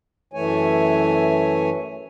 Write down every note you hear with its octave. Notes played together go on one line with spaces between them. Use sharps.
F#2 E3 A3 C#5 G#5